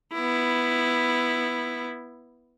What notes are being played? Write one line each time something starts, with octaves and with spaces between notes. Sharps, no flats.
B3 E4